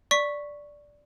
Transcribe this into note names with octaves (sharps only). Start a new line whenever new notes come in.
D5 C#6 B6